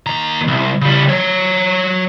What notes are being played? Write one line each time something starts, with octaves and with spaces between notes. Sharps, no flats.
D#2 A#5
C2
C#3 G3
F#3 C#5